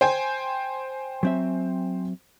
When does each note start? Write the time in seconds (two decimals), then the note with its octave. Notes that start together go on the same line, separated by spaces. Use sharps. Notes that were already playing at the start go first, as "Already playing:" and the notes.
0.01 C5 G5 G#5
1.23 F#3 C4 E5